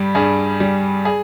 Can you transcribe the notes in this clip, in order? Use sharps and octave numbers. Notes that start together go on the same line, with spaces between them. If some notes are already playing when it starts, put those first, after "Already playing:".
Already playing: G2 G3
G2 G#4
G3
G#4